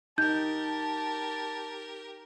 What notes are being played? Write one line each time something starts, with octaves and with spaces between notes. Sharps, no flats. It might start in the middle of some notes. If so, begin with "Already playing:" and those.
D#4 G4 A#4 A5 G6